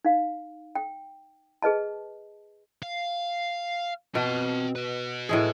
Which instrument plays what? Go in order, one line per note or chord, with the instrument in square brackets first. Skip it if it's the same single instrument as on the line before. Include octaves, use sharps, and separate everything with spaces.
[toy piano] D#4 F5
G5
G#4 B4 D#5 A5
[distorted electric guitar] F5
[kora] B2 [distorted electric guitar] C4 A5
[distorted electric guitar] F#4 B4
[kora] A2 G#3 G#4